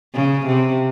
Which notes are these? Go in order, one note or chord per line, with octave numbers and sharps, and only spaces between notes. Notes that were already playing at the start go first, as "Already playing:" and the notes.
C#3
C3